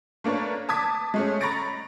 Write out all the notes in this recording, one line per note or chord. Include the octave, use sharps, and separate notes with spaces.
A3 A#3 D4 B4 C#5
A5 D6 D#6 G#6 B6
G#3 A3 C#4
A#5 B5 C#6 A6 A#6 D7